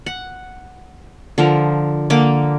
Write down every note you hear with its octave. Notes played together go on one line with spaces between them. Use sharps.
F#5
D3 F3 A#4
D3 A#3 D6